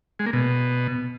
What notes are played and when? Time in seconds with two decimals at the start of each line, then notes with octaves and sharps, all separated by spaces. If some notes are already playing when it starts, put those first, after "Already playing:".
0.19 G#3
0.26 A#3
0.33 B2